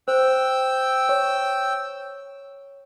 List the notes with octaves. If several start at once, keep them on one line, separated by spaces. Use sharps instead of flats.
C5 G5 E6
C#5